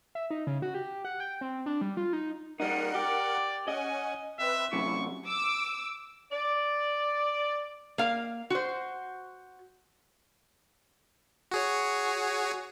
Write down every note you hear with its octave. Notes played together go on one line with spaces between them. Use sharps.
E5
D#4
C#3
F#4
G4
F#5
G5
C4
D4
G3
F4
D#4
G3 D#4 A#4 F#5
G4 D5
C#4 D#5 F#5 G#5
C4 B4 E5
F#2 C3 E4 C#6
D6 E6
D5
A#3 F5
F#4 C5
F#4 G#4 C#5